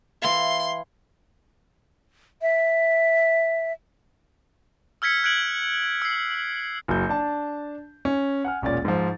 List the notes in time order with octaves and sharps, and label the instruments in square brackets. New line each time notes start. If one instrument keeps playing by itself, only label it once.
[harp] E3 F5 [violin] C6
[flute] E5
[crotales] E6 F6 G#6 B6 C#7
F#6 G#6 C#7 D7 F#7
E6 C7
[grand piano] F#1 F#3 G6
D4 A5
C#4
F#5 G#5 F6
E1 A#2 C#4 D5 A6
G#2 F3